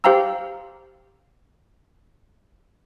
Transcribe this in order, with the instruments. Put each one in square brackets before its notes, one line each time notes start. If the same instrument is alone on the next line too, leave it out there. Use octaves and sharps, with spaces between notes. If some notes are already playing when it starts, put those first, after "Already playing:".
[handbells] G4 C5 F5 G5 A#5 E6